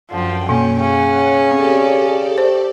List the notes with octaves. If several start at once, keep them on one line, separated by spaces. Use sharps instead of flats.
F#2 D3 F3 G5
B2 A#3 C#4
C#3 C#4 F#5
C4 G4 A4 D5
A3 C5